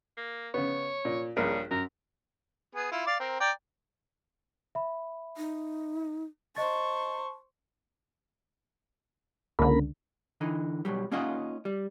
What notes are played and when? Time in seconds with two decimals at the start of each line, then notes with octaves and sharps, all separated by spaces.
0.17 A#3
0.54 C#3 B3 C#5
1.05 A#2
1.37 A#1 G2 C#3 A#4
1.71 F#2 A#4
2.75 B3 G#4
2.91 E4 F4
3.07 D5 F5 D6
3.20 C4 A#4
3.40 D5 G5 A#5
4.75 E5 B5
5.37 D#4
6.56 C5 D#5 A5 C#6 A6
9.59 C#2 D3 A#3 A#4 B5
10.41 D3 E3 D#4
10.85 B1 G2 F#3 G3
11.12 A#3 C#4 D#4 F4 D#5 F#5
11.65 G3